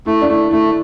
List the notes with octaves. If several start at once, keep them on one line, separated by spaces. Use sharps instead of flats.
A3 E4
D4
A3 E4
A3 E4